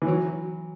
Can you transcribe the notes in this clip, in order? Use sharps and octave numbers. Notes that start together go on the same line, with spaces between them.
E3
F#3